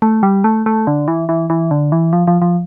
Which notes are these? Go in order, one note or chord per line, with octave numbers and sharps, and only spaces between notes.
A3
G3
A3
A3
D3
E3
E3
E3
D3
E3
F3
F3
F3